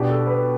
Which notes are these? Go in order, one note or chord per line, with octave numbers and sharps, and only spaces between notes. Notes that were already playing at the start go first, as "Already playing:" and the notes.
Already playing: B2 B3 D4 G4
A4
B4